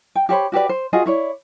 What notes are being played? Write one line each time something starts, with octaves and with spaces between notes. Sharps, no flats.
G5
G4 C5 C#5 B5
F#4 G4 B4 D5
C5
F4 F#4 G#4 D#5
E4 C#5 D5